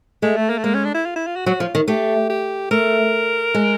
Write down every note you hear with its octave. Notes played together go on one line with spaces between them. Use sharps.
G#3 A3
A3
A#3
A3
G#3 A#3
C#4
D4
E4
F4
E4
F4
F#4
F#3 F#4
F3 F4
D#3
A3 G4
G4
A3 A#4
G#3